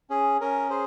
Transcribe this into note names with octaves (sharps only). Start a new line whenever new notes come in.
C#4 G#4
C#4 A#4
G#4 C5